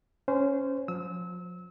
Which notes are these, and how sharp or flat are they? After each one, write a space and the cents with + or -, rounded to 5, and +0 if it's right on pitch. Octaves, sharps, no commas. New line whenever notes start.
C#4 +0 C5 -20
F3 +40 E6 -30